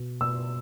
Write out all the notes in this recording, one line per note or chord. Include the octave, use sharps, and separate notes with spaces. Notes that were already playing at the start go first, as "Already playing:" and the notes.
Already playing: B2
B2 E6